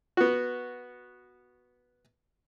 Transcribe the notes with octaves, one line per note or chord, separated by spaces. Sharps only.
B3 F#4